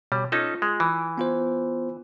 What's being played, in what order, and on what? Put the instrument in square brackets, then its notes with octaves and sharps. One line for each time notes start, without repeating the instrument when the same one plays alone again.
[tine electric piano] B2 C#5 [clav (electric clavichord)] G3
[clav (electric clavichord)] C#4 D#4 A4 [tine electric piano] F4
[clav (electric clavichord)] G#3
E3
[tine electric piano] B3 F4 C5